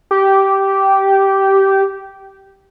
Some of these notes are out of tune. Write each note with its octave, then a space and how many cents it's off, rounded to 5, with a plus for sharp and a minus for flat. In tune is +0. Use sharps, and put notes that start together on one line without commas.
G4 -10